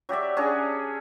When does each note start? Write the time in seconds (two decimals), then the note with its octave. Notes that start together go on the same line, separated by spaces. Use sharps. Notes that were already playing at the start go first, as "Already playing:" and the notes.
0.09 F#3 G4 D5 E5
0.37 C#4 D4 G#4 A#5